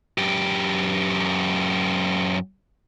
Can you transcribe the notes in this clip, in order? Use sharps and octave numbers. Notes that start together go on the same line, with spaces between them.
F#2 G4